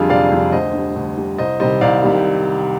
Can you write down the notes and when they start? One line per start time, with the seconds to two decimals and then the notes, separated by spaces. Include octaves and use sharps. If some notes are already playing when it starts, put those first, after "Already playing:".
Already playing: F2 D3 G3 F4 G#4
0.10 F1 D5 F5
0.32 F2 D3 G3
0.52 D2 C5 D#5
0.74 D3 G3
0.96 D2
1.17 D3 G3
1.38 C2 C5 D#5
1.60 C3 D#3 G3 C5 D#5
1.81 C2 D5 F5
2.03 C3 D#3 G3